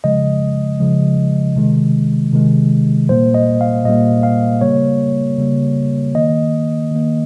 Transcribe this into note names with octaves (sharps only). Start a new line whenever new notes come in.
C#3 F3 G#3 D#5
C#3 F3 G#3
C3 D#3 G#3
C3 D#3 G#3
A#2 G3 A#3 C5
D#5
F5
A#2 G3 A#3 D#5
F5
C#3 G3 A#3 C#5
C#3 G3 A#3
D#3 A#3 D#5
D#3 A#3